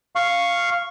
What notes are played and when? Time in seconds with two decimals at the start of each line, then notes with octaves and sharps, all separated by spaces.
0.16 F5 C#6